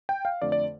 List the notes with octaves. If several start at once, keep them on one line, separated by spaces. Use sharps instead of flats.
G5
F5
F2 D3 A3 D5
D5